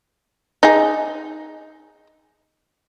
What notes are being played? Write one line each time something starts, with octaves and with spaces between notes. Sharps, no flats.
D#4 G#4